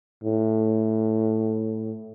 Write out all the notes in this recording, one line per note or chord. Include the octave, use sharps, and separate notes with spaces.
A2